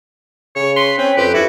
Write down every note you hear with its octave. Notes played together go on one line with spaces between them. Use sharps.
C#3 C#5
B4 C6
C4 C#4 B4
F2 G4 B4
G2 E4 F#4